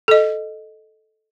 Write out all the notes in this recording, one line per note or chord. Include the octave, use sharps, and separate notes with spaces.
A4 D#5